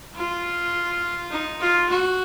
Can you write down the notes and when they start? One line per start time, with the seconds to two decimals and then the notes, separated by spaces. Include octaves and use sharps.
0.16 F4
1.31 D#4
1.61 F4
1.90 F#4